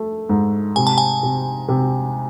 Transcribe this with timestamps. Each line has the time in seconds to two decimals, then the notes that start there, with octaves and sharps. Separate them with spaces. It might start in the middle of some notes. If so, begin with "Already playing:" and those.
Already playing: A3
0.29 G#2
0.76 C3 G#5
0.87 A5
0.98 G#5
1.23 C3
1.68 C3